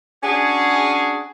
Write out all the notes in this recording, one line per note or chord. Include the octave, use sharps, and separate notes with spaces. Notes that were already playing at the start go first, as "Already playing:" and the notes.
C#4 D4 F#4 G#4